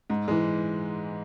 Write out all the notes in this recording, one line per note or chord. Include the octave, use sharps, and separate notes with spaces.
G#2
E3 G#3